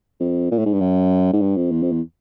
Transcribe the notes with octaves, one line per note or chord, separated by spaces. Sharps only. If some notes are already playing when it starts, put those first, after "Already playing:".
F2
A#2
A2
G#2
G2
F#2
G#2
G2
F2
E2
F2
E2